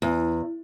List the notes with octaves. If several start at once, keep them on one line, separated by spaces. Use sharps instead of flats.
E2